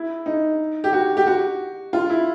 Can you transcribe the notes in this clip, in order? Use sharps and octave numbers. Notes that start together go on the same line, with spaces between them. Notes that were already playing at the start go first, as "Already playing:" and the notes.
Already playing: E4
D#4
G4
F#4
G4
F#4
F4
E4